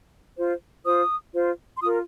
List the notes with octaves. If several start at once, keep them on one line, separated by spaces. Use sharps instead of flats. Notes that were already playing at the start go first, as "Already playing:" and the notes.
F4 C5
F4 C5 D#6
F4 C5
C6
F4 A#4 D#6